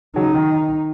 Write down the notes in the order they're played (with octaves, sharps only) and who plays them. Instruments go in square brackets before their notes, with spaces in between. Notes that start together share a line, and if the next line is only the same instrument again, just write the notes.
[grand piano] C#3 F#3 [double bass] D#4
[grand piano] D#3
D#3